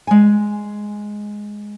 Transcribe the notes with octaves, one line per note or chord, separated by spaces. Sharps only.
G#3 G#5